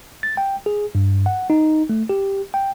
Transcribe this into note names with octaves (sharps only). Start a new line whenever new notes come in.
A6
G5
G#4
G2
F#5
D#4
A3
G4
G5